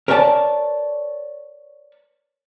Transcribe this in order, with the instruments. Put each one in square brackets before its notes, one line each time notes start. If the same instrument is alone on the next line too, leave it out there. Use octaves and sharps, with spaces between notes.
[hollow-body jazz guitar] A#4 B4 C#5 D5 G5 A5